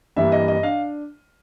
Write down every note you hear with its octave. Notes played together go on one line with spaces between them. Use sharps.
G2 E3 G3 A#3 E5
D#5
D#5
D4 F5